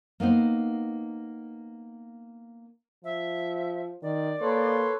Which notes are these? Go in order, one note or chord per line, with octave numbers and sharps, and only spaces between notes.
A#3 B3 D#4 C5
F3 E5
D#3 D5
A#3 A4 B4 C#5 C6